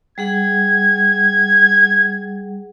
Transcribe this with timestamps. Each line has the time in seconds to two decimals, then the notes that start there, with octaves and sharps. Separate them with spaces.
0.18 G3 G#4 F#5 G#6